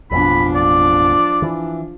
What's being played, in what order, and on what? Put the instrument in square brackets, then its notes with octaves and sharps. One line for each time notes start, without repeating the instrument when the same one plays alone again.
[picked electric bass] A1 F2 B2 [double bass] F3 D4 [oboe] B5
[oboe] D5
[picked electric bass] E3